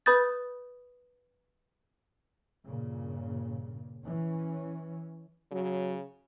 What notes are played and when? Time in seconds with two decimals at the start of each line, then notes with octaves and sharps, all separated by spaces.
0.06 B4 B5 D#6 G6 A6
2.66 G2 A#2 C#3
4.02 E3 C#4
5.52 C#3 F#3